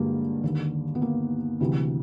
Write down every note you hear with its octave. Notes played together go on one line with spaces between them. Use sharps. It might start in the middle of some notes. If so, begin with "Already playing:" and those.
Already playing: G2 D3 F#3 G#3 A#3
D#2 D3
B3
A#3
D2 C3 E3